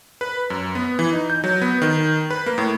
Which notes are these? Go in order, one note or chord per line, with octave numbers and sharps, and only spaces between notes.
B4
F#2
B3
E3
D#4
G6
F#3
B3
D#3
B4
A#3
A2